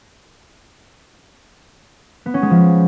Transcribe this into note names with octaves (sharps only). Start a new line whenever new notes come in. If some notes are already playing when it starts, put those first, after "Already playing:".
B3
C#4
G#3
F3